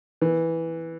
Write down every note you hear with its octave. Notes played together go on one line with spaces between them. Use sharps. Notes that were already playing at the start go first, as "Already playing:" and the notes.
E3